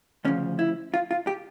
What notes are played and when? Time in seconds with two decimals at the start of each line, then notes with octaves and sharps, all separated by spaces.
0.25 D2 C#3 F3 C#4
0.59 E4
0.94 F4
1.11 F4
1.27 G4